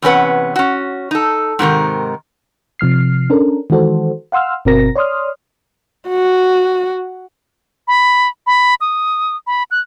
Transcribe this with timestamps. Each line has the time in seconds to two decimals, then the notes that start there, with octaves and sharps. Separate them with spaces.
0.02 E2 C3 C#4 B4 F#5
0.56 C#4 F#4
1.11 D#4 A4
1.59 G#2 C3 D#3 A#4
2.79 C3 F3 F6 C7
3.30 C#4 D4 A4 A#4
3.70 D#3 E3 G#3 F#4 A4 C5
4.32 F5 F#5 C6 E6 F6
4.65 G1 B2 C4 F#4 A#4 A#6
4.96 C#5 D5 C6 D#6 F6
6.09 F#4
7.88 B5
8.47 B5
8.81 D#6
9.47 B5
9.71 F#6